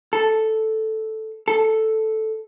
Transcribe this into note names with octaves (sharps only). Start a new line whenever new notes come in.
A4
A4